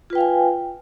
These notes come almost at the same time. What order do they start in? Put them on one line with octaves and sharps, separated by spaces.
F4 B4 G5 F5 G#5